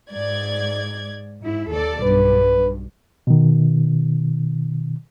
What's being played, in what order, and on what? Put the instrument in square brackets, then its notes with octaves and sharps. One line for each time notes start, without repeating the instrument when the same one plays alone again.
[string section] G#2 D5 G#6
G#2 E4
D#2 A4 D5
[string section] B1 G2 [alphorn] B4
[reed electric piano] B2 D#3